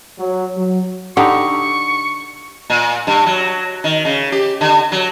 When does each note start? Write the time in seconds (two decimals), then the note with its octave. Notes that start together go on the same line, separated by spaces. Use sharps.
0.19 F#3
0.56 F#3
1.17 D3 D#4 G4 C#6
2.70 A#2
3.07 G2
3.26 F#3
3.84 D#3
4.05 C#3
4.32 G4
4.61 D3
4.92 F#3